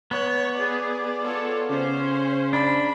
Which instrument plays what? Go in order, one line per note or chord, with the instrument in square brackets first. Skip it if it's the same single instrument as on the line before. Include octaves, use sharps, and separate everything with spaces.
[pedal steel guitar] B3 [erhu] C#5
[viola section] G#4 [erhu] D5
[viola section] F4 A4 C#5
[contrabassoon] C#3 [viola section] C#4 C5
[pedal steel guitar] D4 [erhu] B5